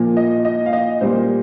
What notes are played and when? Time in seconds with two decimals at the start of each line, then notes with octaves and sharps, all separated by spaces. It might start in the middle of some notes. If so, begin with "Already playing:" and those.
Already playing: A#2 F3 A#3
0.17 D#5
0.45 D#5
0.66 F5
0.73 D#5
1.01 A#2 G3 A#3 C5